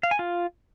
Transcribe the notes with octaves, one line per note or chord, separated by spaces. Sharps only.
F5
G#5
F4